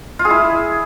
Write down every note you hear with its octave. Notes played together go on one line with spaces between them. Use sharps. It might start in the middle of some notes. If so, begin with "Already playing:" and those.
F4
G#4
E4